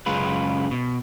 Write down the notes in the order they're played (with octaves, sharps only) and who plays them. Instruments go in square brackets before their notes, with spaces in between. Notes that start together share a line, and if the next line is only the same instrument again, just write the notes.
[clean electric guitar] F#2 C#3 G#3 F4 B4
B2